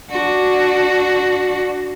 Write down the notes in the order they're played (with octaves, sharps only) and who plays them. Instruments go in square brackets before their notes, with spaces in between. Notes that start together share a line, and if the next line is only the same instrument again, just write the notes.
[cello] D4 F#4